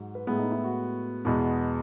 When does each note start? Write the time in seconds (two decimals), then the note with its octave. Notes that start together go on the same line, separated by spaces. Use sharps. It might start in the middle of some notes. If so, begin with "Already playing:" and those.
Already playing: G#2 F#3
0.15 B4
0.27 A2 G#3 B3 G#4
0.39 D#4
0.51 E4
0.64 F#4
1.25 E2 B2 G#3 B3